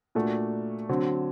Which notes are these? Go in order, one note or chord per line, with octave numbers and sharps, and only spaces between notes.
A#2 A3 D4 F#4
D3 F#3 C4